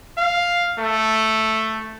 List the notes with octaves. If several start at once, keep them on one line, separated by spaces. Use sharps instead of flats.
F5
A3